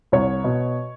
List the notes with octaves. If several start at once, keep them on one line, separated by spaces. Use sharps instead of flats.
C2 C#5
B2